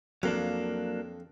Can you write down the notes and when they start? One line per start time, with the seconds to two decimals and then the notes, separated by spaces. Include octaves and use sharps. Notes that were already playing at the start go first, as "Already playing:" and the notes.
0.23 F2 F#3 A#3 D4